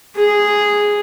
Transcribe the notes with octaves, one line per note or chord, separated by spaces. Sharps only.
G#4